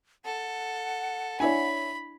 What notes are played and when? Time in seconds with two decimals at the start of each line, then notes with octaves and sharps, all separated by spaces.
0.25 A4 F#5
1.40 D4 E4 C#5 D5 E5 G#5 B5